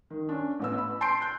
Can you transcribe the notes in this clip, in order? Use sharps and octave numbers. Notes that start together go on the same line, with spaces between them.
D#3
C#4 D4
A1 B3 E6
B5
A5 C6 G6 C7 D7
F#6 G6